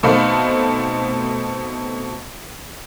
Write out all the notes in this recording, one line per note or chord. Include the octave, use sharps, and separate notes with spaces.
B2 A3 C4 D#4 F5 B5